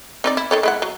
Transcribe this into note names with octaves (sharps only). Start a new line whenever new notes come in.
C4 D#4 D5
E4
D#3 A4 C#5
G#3 E4 F#5
F#3